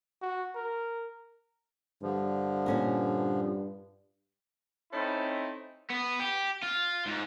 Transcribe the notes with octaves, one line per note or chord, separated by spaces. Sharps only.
F#4
A#4
G2 D3 F3
A#2 C#4 A#4
A3 C4 C#4 D#4 E4
B3
G4
F4
G#2